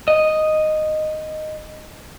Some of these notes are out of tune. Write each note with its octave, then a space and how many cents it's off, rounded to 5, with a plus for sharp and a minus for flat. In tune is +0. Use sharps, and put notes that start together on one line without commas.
D#5 -5